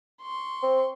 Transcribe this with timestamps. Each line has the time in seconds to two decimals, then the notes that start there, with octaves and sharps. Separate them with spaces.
0.22 C6 C#6
0.63 C4